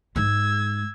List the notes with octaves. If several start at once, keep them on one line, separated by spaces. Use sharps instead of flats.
G#2 G#3 E6 G#6